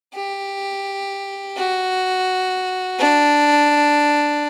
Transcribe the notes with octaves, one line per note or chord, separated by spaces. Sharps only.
G4
F#4
D4